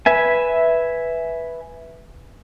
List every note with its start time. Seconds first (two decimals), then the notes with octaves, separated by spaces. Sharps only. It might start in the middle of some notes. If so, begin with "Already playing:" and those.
0.06 B4 E5 G#5